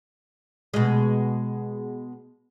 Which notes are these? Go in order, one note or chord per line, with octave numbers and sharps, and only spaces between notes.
B2 G#3